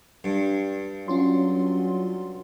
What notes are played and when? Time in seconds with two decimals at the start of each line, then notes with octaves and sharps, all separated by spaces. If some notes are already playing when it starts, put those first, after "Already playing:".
0.24 G2
1.08 F#3 C#4 F4 C6